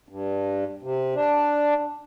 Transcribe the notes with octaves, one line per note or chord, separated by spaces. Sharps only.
G2
C3
D4